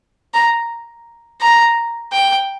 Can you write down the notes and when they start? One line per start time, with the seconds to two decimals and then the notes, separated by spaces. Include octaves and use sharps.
0.34 A#5
1.41 A#5
2.13 G5